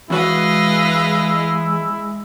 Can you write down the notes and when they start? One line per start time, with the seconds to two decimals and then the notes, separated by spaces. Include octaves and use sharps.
0.10 E2 G#3 E4 F#4 B4 D#5 F5